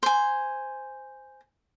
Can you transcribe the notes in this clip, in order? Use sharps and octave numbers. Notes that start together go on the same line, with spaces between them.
C5 G#5